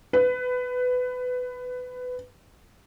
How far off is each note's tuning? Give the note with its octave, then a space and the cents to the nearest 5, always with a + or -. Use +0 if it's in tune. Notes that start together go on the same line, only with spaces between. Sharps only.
B4 +15